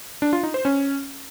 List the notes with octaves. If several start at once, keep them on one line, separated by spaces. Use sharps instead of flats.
D4
F4
D#4
C5
C#4